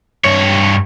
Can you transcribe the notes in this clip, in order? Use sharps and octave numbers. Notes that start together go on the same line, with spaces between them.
G2 C#5